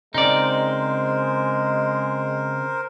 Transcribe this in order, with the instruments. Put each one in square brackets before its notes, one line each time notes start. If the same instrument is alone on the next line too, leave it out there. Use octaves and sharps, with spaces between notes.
[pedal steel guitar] C#3 C4 [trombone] G#3 [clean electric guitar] D#4 D5 [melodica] A#4 C5